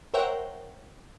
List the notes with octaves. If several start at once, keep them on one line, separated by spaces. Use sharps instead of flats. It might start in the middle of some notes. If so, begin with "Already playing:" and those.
A#4 C5 C#5 E5 F#5 G5